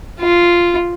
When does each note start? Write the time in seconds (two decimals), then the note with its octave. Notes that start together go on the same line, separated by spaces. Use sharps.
0.20 F4